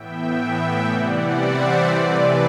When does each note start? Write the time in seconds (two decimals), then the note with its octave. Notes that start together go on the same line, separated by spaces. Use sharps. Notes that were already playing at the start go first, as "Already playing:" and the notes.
Already playing: A2 E3 B3 E5 G5
0.36 E5 G5
0.85 C3 E3 G3 C4 D5 F#5
1.35 C5 E5
1.85 C3 E3 A3 C4 B4 D5